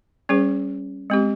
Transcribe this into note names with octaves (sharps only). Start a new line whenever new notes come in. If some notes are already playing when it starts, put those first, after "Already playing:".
G3 C#4 G#4 C5
G#3 C4 G4